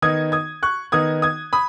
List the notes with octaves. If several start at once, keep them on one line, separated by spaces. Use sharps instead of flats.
D#3 B3 D#4 D#6 G#6
D#6 G#6
C#6 F#6
D#3 B3 D#4 D#6 G#6
D#6 G#6
B5 D#6